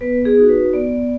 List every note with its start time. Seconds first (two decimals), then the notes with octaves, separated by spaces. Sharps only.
0.01 B3 B4
0.25 G#4
0.37 D#4 F#4
0.49 B4
0.73 B3 D5